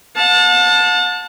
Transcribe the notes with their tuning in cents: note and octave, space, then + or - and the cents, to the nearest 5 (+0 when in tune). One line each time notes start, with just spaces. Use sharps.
F#5 -45 A5 +0